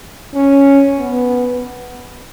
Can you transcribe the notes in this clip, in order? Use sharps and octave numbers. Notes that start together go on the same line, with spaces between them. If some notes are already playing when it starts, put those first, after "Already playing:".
C#4
B3